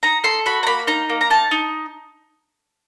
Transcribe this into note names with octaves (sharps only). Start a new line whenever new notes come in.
D#4 A#5
A4 C6
F#4 B5
A#5
A#3 B5
D#4 A#5
A#3
A#5
D#4 A5
D#4